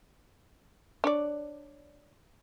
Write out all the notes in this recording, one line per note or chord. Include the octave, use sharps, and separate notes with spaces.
D4 C#5 D5